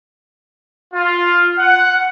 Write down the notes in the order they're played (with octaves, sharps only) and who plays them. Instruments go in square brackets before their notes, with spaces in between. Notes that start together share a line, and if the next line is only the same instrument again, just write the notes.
[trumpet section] F4
F#5